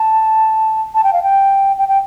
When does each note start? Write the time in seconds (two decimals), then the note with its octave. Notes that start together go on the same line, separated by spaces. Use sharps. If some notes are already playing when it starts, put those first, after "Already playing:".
Already playing: A5
0.94 A5
1.04 G5
1.13 F5
1.23 G5
1.78 G5
1.88 G5